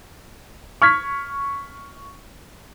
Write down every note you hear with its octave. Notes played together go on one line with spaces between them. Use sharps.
C#6 F6 G#6 B6